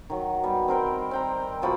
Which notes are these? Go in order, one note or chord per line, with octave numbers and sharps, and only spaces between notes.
D#3 F#3
G3 B3
C4 A#4 C5 G5
C4 G5 A#5
B2 F3 F#4 B5